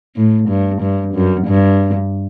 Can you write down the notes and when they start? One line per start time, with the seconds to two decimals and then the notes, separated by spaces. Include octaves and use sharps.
0.16 A2
0.49 G2
0.82 G2
1.14 F#2
1.47 G2